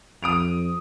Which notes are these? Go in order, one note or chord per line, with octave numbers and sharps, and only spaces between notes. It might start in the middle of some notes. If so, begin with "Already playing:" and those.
F2 D#6 D7 F7